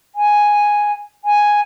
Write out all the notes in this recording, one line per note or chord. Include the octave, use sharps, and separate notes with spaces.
G#5
G#5